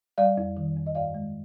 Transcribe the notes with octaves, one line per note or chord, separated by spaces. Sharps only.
G3 D5 F5
F2
D#3
F2
D#5
G2 D5 F5
G#3